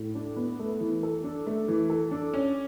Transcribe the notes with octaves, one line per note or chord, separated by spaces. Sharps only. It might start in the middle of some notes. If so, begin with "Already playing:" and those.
Already playing: A2
D4
B3
A3
E3
A4
D4
A3
E3
A4
D4
C#4